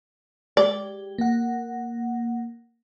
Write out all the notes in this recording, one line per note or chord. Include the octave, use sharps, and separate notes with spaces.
G#3 G4 D5
A#3 F#5